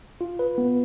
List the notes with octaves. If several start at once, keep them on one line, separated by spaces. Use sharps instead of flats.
F4
B4
B3